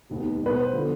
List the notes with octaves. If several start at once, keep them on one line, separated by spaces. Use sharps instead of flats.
F1 D#2 D#3 B3
B1 B2 G3 B4
C5
D3 F3 B3